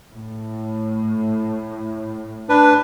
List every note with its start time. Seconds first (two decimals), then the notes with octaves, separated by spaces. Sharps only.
0.11 A2
2.49 D4 B4